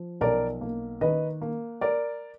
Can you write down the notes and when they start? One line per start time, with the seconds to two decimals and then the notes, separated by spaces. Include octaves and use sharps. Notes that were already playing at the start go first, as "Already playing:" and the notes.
Already playing: F3
0.21 B1 A#4 D5
0.61 A#3
1.01 D#3 B4 D#5
1.41 A#3
1.81 A#4 D5